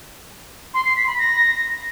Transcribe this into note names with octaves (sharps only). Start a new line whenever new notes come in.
C6
C7
B6
B5
A#6